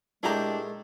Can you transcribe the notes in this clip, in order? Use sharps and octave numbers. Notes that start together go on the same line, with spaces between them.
A#2 G#3 A3 D4 E4 G4 G#4 A#5